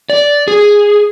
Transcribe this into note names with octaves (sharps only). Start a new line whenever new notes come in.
D5
G#4